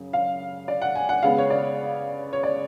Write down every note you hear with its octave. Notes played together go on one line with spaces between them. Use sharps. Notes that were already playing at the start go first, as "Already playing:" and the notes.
Already playing: F#2 C#3
F5
D5
F#5
G#5
F#5
C#3 G#3 B3 F5
C#5
D5
C#5
D5